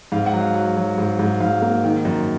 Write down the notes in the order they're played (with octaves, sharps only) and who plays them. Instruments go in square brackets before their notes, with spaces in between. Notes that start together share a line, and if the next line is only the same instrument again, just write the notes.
[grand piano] G#2 F5
F#5
F#3
F5
F#3
F#3
G#2
G#2
G#2 F5
A#3
D#3
F#2